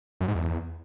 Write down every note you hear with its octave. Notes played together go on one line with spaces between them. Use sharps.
F#2
G#2
E2